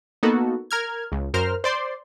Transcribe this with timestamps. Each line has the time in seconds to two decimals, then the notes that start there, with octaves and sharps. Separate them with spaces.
0.23 A#3 B3 D#4 F#4 A4
0.71 A#4 F6 G#6
1.12 C#2
1.34 F#2 A#4 C5 F6
1.64 C5 D5 C6